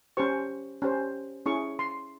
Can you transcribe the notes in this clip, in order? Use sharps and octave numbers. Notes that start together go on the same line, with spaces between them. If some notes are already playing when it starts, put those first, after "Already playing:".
C#4 G4 C5 C#6
C#4 G4 C5
C#4 E4 G#4 C#6
C6